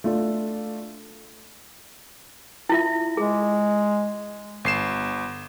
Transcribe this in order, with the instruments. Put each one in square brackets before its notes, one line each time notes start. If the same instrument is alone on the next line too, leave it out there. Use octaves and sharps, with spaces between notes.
[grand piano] A3 D4 F4 D5
[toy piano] E4 F4 E5
[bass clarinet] G#3 [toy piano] G#4
[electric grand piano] G1 C7 E7